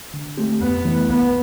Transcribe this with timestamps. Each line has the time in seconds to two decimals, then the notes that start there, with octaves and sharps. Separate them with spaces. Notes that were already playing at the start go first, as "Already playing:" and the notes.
0.14 D3
0.38 A3 C4 G4
0.61 F2 B3
0.85 E3 A3
1.09 C2 B3